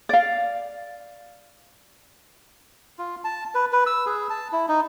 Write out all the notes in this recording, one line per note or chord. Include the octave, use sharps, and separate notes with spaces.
D5 F5
F4
A5
B4
B4
E6
G#4
A5
E4
D#4